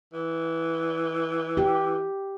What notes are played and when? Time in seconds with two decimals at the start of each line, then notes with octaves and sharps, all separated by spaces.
0.13 E3
1.57 G4